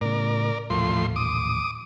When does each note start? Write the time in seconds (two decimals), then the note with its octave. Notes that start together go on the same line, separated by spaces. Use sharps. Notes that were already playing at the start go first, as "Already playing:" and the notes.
0.01 A2 C#3 A#4 D5
0.70 D#1 A1 A2 F3 C6
1.16 D6 D#6